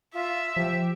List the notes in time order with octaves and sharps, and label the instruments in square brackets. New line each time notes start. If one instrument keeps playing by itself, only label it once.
[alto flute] F4 [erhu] E5
[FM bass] F3 [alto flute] G4